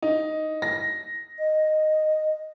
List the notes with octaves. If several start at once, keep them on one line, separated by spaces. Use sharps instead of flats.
D#4
A#6
D#5